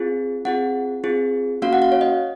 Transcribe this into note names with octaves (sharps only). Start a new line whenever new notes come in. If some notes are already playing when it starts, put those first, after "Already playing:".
Already playing: C4 F4 G#4
C4 F4 G#4 F#5
C4 F4 G#4
A#3 C#4 F#4 F5
F#5
F5
C#5
D#5